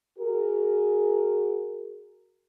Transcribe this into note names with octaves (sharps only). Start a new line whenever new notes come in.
F#4 G#4 A#4